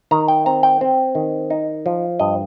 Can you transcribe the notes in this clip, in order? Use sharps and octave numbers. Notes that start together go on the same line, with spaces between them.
D#3 A#5
G5
C4 A#5
G5
C4
D#3
D#4
F3
G2 D#5